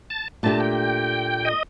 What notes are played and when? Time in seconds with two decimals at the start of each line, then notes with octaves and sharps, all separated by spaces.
0.10 A5
0.43 A#2 A3 D4 G4 A5
0.60 G5
1.45 D#5